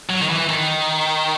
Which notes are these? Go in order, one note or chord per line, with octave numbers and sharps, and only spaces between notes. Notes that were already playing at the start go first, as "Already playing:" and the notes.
F#3
D#3
E3
D#3